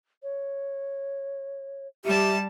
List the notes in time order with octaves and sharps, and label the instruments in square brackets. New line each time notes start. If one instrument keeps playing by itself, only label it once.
[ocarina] C#5
[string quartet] G3 A5 [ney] G4 [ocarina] E5